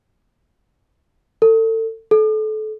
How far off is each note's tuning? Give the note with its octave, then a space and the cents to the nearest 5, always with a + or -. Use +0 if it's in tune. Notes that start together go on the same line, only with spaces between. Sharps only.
A4 +30
A4 -30